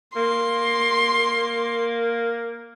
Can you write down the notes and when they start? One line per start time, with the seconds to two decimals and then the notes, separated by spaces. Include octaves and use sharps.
0.16 A#3 C6